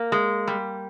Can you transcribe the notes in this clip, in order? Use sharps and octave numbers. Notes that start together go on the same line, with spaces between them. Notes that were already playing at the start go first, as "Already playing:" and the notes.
Already playing: A#3
G#3
G3